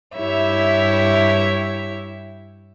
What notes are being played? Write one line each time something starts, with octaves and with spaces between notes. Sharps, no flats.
G2 E4 G4 C#5 E5